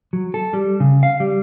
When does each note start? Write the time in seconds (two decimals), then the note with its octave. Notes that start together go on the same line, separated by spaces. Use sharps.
0.13 F#3
0.34 A4
0.53 G3
0.80 C#3
1.03 F5
1.20 G3